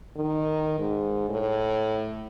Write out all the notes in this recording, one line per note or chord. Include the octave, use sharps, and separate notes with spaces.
D#3
G#2
A2